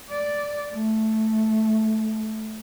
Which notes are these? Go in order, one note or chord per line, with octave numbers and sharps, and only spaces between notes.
D5
A3